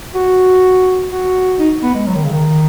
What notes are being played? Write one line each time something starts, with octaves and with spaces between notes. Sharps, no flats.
F#4
F#4
D#4
B3
G#3
F#3
D#3
C#3
D#3